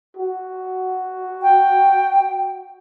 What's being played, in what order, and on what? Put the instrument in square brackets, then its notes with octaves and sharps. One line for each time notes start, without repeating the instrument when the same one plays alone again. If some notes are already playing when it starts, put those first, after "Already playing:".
[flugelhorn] F#4
[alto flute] G5